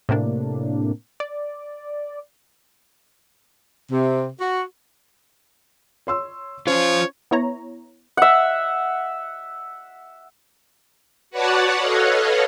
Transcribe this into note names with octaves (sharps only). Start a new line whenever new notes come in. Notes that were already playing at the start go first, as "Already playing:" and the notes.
A2 C3 A#3 D4
D5
C3
F#4
C#5 C6 E6
C#4 F4 C5 C#5
B3 E4 C#5 A#5
E5 F#5
F#4 B4 C#5 D5 F#5 A5
A4 B4 C#5 D#5 F5 F#5